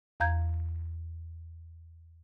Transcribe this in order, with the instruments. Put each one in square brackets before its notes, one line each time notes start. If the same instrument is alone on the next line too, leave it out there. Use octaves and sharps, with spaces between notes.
[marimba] E2 F5 A#5 G6 G#6